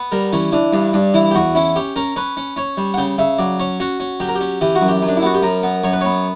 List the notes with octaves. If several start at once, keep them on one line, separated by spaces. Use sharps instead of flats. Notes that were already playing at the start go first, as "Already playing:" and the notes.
Already playing: B3
G3 A#4
E3 C#4
E3 D4
G2 D4
G2 D4
E3 E4
G4
E2 F#4
C#4 E4
C#4 G4
C#4 A#4
C#4 B4
C#4
C#4 C#5
G3
F#5
C#3 G5
C#3 E5
F#3 D5
C#4 C#5
C#4 F#4
C#4
F#3 G4
A#4
G4
C#4
E3 G4
F#4
F#2
G4
F#2
D4
E4
B3 F#4
G4
F#2 A#4
B3
F#2 C#5
B4
B3 C#5